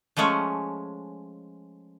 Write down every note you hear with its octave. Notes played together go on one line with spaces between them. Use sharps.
F3 G#3 A3 C#4 C#5